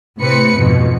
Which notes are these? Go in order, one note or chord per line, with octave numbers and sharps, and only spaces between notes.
A2 C3 C4 B4 C#7
F2 G#2 B2